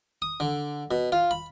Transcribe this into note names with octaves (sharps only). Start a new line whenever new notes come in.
D#6
D3
B2
F4
B5